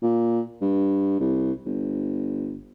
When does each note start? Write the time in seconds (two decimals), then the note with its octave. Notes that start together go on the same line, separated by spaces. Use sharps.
0.02 A#2
0.61 G2
1.20 C2
1.65 G1